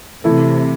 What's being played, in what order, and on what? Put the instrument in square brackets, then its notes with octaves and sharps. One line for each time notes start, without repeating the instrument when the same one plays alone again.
[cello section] C3 [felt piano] E3 A3 E4 A4